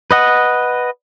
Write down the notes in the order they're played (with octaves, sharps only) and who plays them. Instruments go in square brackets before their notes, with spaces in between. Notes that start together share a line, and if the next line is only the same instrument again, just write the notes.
[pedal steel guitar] B4 D#5 F#5